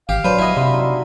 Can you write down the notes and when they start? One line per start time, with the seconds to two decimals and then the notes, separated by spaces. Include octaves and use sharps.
0.09 G#1 G4 F5
0.24 F#3 D4 B4 C5
0.39 E4 F#4 D#5 B5
0.57 C3 E5 C6
0.74 D#4